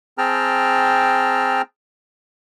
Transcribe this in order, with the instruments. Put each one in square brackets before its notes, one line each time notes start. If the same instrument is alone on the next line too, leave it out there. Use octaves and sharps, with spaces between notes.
[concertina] C4 G#4 G5 A5 A#5 F6